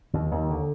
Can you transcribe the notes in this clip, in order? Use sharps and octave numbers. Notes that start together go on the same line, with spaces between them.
D#2 D#3
D#2
D3